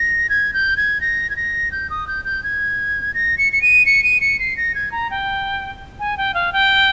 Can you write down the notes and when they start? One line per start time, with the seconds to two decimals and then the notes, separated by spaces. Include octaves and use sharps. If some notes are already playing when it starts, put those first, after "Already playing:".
Already playing: A#6
0.30 G#6
0.54 G6
0.77 G#6
1.01 A#6
1.30 G#6
1.36 A#6
1.72 G6
1.90 D#6
2.08 G6
2.25 G6
2.44 G#6
3.14 A#6
3.38 C#7
3.52 C#7
3.62 D#7
3.86 C#7
4.04 D#7
4.21 C#7
4.40 C7
4.57 A#6
4.75 G#6
4.92 A#5
5.11 G5
6.00 G#5
6.17 G5
6.34 F5
6.53 G5